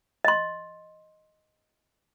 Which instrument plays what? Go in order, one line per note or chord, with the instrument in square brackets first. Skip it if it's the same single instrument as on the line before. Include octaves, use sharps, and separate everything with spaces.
[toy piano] D#5 C6